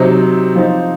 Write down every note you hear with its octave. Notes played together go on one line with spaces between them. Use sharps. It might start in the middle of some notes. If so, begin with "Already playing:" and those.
Already playing: C3 F#3 C4 D#4
F3 C4 D#4